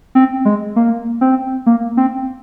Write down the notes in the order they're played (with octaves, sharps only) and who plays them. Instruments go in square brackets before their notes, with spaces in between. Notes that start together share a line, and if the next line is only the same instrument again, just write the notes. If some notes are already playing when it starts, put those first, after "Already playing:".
[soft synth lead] C4
G#3
A#3
C4
A#3
C4